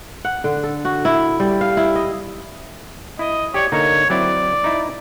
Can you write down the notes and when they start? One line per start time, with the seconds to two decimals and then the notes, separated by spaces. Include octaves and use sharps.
0.25 F#5
0.44 D3
0.63 A4
0.85 F#4
1.05 E4
1.40 G3
1.61 F5
1.77 E4
1.95 D#5
3.19 E4 D#5
3.54 G4 C#5 D5 G5
3.72 D3 A#3 D#4 C#5
4.10 F#3 C4 E4 D5
4.64 D#4 E4